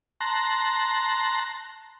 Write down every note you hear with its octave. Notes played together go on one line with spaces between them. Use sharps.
A5 A#5 C6 F#6 A#6